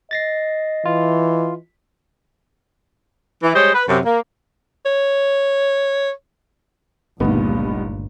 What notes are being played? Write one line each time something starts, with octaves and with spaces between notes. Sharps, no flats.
D#5 A6 A#6 C7
E3 F4
E3
G3 G#3 C5 C#5 D#5
B4
F#2 C3
A#3
C#5
G1 C#2 G2 A#2 D3 A3 B3 D#4